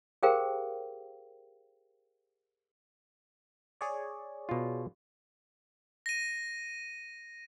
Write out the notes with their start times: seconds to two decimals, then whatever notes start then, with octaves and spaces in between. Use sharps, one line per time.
0.23 G4 G#4 A#4 C5 F5 G5
3.81 G#4 C#5 D5
4.49 B2 F4
6.06 A#6 D#7